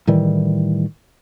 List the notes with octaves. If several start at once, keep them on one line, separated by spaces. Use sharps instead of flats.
A2 D#3 E3 G3